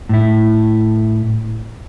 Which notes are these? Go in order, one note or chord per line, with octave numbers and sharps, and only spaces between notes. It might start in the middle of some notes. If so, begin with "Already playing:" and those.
A2 E4